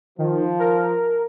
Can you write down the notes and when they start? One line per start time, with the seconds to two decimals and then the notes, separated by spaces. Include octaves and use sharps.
0.18 D#3 F3
0.59 A#4